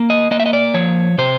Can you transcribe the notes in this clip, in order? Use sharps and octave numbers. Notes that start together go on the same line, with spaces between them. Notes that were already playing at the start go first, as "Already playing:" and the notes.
Already playing: A#3
D#5
A#3 D#5
E5
D#5
D5
F3 C#5
C3 C5